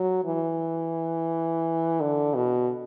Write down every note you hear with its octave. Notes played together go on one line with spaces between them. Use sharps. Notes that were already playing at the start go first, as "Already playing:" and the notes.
Already playing: F#3
E3
D3
B2